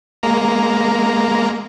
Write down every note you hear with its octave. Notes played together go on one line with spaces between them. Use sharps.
G#3 A#3 A#5